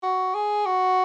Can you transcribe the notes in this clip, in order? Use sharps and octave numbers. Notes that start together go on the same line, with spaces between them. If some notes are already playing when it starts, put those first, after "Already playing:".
F#4
G#4
F#4